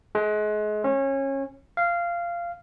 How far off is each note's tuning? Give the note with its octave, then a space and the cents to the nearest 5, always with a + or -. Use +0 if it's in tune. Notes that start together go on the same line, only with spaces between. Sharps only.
G#3 +30
C#4 -25
F5 -15